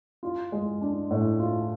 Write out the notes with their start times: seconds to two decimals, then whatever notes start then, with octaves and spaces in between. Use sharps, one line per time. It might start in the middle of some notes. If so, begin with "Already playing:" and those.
0.23 F4
0.52 G#3
0.81 D4
1.11 A2
1.40 F4